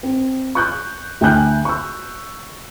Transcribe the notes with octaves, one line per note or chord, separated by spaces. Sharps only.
C4
C#6 F#6 G6
D2 G5 G#5 F#6 G6
C#6 E6